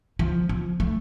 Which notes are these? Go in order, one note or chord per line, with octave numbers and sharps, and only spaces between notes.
F3
F3
A3